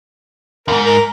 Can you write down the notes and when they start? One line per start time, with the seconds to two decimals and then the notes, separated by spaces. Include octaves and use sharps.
0.68 D#2 G#2 A#4
0.85 A#4